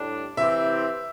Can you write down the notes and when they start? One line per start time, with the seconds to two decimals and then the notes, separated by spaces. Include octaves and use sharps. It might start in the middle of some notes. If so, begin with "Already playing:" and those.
Already playing: A2 G3 D4
0.37 C3 E3 C4 G4 E5